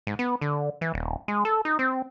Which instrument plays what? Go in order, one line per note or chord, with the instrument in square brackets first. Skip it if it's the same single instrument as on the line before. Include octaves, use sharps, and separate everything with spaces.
[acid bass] G#2
B3
D3
E3
D#1
G#3
A4
D#4
C4